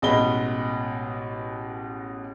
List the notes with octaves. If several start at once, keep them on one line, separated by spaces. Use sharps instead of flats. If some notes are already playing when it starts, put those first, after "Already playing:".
A1 B2 G#3 D#5 B5 G7